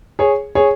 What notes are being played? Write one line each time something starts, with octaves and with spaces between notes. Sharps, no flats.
G#4 C#5
G#4 C#5